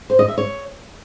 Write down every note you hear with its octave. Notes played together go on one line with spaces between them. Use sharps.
C5
D#5
E5
C#5